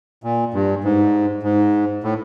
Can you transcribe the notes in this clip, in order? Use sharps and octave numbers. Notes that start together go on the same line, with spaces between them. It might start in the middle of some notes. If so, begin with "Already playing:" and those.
A#2
G2
G#2
G#2
A2